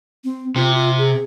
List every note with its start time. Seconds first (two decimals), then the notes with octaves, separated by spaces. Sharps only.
0.24 C4
0.56 C3 F4
0.75 F4
0.98 G#4